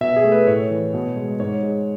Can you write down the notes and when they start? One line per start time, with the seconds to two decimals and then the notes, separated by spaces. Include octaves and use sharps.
0.01 B2 E5
0.16 G#4
0.24 A3
0.32 B4
0.47 A2 C#5
0.71 E3
0.94 B2
1.16 G#3
1.40 G#2 C#5
1.63 G#3